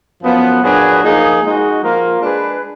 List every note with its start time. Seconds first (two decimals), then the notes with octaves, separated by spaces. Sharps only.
0.23 F#2 F3 B3
0.63 A#2 F#3 D4 G#4 B4
1.02 F3 A#3 D#4 G#4
1.43 G#3 D#4 F#4
1.82 F3 A#3 F4 A#4
2.21 G#3 D4 G#4 B4